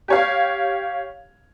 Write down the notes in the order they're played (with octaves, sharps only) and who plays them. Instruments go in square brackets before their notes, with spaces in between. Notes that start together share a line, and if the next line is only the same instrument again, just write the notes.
[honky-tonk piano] G4 C#5 F5